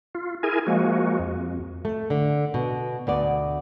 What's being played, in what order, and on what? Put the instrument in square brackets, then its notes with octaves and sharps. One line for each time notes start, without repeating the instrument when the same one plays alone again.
[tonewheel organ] F4
E4 G#4 A#4 G#5
F3 G#3 A#3 F#4
F2
[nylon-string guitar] A3
D3
B2
D2 B3 D5